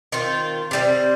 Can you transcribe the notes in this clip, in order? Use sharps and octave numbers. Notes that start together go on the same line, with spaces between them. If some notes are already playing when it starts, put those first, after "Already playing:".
D#3 C4 F4
C3 G3 C4